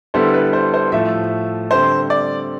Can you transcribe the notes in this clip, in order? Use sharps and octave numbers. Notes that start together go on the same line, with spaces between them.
D3 G3 B3 E4 A4 C5
B4
C5
C5
A2 F3 A3 E5
D3 G3 C4 C5
D5